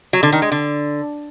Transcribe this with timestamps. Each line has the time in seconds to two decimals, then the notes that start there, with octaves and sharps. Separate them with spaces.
0.13 F#3
0.23 D3
0.32 D#3
0.42 G#3
0.52 D3